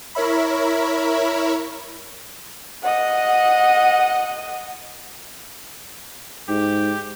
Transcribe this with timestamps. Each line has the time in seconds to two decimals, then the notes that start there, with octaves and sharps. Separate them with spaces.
0.15 E4 A#4 C#5 E5 B5
2.83 D#5 F#5
6.48 G#2 G4